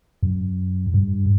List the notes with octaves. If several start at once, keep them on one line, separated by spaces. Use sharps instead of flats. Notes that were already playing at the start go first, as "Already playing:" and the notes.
F#2
G2